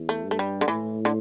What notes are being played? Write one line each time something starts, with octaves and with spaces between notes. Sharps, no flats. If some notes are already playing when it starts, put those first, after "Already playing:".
Already playing: E2
A3
G2
A3
G3
D3
A2 E3
D3